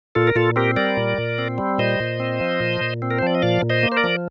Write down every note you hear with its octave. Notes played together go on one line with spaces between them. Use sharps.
A#2 F4 A4
A#4
A#2 F4 A4
C4 G4 A#4
G3 A#4 D5
A#2
A#2
C4
G3
A#2 C5 D#5
A#2
C4
F3
A#2
A#2
C4
A#4
C5
F3 D5
D#5
A#2 D5 F5
A#2
C5 D#5
A#3
C5
A#4 D5
F3